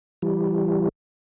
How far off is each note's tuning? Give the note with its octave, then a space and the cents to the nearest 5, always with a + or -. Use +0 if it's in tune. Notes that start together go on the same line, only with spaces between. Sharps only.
E3 +25 G3 +0